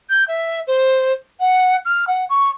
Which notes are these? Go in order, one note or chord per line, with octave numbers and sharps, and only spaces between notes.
G6
E5
C5
F#5
F6
F#5
C#6